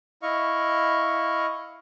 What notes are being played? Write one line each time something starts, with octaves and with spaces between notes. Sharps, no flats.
E4 D#5 F5 C#6